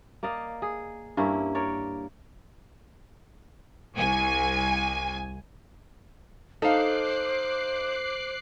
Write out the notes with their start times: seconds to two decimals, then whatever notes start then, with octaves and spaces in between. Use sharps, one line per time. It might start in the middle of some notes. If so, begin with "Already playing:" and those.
0.23 A#3 D5 D#5 F5
0.62 G#4
1.17 G2 A#3 C#4 E4
1.55 A#4 C#5 D5
3.96 C2 G#5
6.62 D#4 A4 C5 F5 D6 F#6 C7